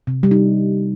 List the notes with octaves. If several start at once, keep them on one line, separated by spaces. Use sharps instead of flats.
C3
G3
D#4